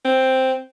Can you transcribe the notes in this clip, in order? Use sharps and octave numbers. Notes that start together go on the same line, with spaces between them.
C4